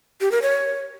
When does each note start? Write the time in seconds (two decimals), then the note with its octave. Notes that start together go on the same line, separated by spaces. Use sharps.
0.21 G4
0.32 A#4
0.42 C#5